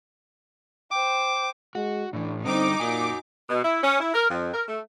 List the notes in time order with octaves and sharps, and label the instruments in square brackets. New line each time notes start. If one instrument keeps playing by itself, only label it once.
[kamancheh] C5 G5 [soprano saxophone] D6
[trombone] G#3 [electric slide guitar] F#4
[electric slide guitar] A2 E3 [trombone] D4
[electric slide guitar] D3 G3 [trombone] C4 [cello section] D#4 [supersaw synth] D6
[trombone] A#2 [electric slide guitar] F#4 G#5
[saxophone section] B2
E4
C#4
E4
A#4
F2
A#4
A3